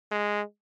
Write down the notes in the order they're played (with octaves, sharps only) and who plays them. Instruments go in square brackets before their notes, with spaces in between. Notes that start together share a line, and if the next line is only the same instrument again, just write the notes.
[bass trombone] G#3